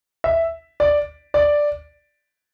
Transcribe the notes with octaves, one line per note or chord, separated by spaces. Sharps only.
E5
D5
D5